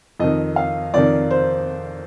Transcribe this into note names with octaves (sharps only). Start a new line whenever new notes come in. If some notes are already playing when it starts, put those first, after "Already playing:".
F2 D#3 D#5
F5
F2 D#3 D5
C5